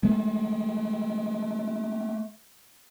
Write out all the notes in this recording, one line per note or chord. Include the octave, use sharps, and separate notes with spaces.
G#3 A3